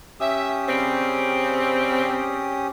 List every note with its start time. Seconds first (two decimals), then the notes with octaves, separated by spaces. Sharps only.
0.20 C#4 G4 E5 D#6
0.68 C#3 G3 C4